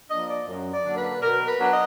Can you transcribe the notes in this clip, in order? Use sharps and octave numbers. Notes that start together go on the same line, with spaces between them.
F3 A#3 D4 D#5
D5
F#2
D5
D3 F#3 A#3 D4
B4
B2 A#4
B4
F#3 B3 D4
D#5